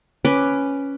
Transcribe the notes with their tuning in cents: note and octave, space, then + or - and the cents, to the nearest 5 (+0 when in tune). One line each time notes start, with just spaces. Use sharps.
C#4 +0 B4 +0 D6 +0